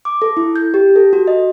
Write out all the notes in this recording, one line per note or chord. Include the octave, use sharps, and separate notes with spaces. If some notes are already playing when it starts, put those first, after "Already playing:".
D6
A4
E4
G6
G4
A4
F#4
D#5